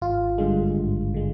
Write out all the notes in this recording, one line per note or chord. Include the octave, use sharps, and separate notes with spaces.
G#1 F4
G2 D3 G#3
G#1
D3 G#3